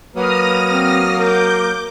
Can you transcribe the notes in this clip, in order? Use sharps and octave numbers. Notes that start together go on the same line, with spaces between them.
F#3 A#3 B4 D#6 F6 A#6
C4
A#4 D6 G6